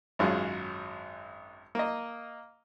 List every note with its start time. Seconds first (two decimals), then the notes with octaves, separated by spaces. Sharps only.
0.19 G#1 F#2 F#3 G#3 F4
1.75 A#3 D#5